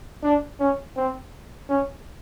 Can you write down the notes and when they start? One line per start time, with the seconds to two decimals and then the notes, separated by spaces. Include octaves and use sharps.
0.23 D4
0.60 C#4
0.96 C4
1.69 C#4